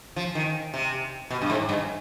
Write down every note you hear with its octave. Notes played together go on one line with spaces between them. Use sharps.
F3
D#3
C3
B2
G2
G#2
G2